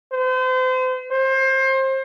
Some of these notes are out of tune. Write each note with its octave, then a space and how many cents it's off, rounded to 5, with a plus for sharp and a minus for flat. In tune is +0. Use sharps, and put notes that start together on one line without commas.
C5 -35
C5 +25